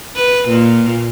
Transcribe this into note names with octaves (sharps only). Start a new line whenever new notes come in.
B4
A#2